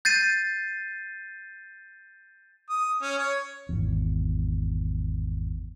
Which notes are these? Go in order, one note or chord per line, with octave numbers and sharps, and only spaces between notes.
G6 A6 C7 D#7
D#6
C#4
C#5
G#1 E2